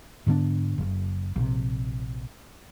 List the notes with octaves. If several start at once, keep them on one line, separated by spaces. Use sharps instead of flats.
G#2 D3 B3 D4
F#1
A#1 C3